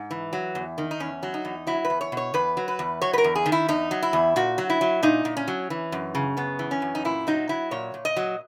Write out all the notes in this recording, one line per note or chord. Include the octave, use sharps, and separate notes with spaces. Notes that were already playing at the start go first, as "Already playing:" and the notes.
Already playing: G#2
E3
F#3
E2
D#3
D#4
E2 C#4
F#3
D#4
E2
F#3 E4
B4
E2
C#5
B2
C#5
E2 B4
F#3
B4
E2
F#3 C#5
B4
A#4
E2
G#4
D#3
E4
E2 D#4
F#3
E4
E2
A#2 F#4
F#3
E4
F#3
A#2 D#4
A#2
C#4
F#3
E3
F#2
C#3
F#2 B3
E3
C#4
F#2
D#4
A#2 E4
F#3 D#4
F#3 E4
A#2 C#5
A#2
D#5
F#3